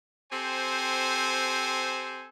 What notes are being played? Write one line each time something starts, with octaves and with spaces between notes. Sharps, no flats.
C4 G4 A4 C5 G#5